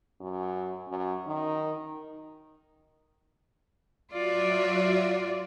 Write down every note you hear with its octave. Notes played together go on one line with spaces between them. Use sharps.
F#2
F#2
D#3
F#3 F4 F#4 D5 E5